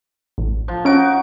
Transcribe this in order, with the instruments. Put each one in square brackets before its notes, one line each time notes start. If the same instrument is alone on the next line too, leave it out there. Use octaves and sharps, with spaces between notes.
[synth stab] A1
[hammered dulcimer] F3
[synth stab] C#4 D7 [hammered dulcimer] D#4 F#4